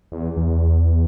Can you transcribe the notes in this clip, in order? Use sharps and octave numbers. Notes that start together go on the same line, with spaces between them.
E2
E2